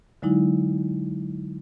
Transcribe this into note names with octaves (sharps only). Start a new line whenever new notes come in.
D3 F#3 G#3 D#4 E4